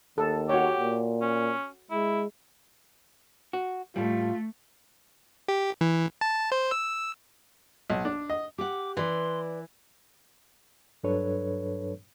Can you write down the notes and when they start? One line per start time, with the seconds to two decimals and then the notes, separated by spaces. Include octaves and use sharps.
0.18 D#2 A4
0.49 F#4 G4 C#5
0.79 A#2
1.22 C#4
1.91 G#3 E4
3.53 F#4
3.96 A2 G3 A3 F4
5.48 G4
5.81 E3
6.21 A5
6.52 C5
6.71 E6
7.90 B1
8.05 D4
8.30 D#5
8.58 G4 F#5 D6
8.97 E3 B4 D5 C6
11.03 G2 F#3 D4 A4 B4 C#5